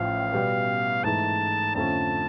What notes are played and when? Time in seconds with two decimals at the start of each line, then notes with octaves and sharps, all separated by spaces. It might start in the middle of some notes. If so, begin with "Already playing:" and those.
Already playing: A1 A2 F3 F5
0.33 B2 G3 B3
1.04 G#2 E3 A3 A5
1.75 F2 D3 F3 A3 C#4 A5